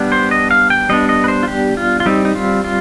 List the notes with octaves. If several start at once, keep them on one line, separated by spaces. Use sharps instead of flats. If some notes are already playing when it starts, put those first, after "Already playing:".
Already playing: G3 B3 D4
C5
D#5
F5
G5
G3 B3 D4 D#5
D#5
B4
C5
F4
G4
F4
F4
G3 C4 D#4
D#4
F4
F4